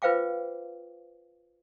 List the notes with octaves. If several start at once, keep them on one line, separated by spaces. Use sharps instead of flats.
F4 B4 C5 F5 G5 D6